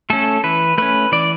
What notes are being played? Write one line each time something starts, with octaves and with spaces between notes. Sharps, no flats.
A3 C#4 A4
E3 B4
A3 C#4 B4
E3 D5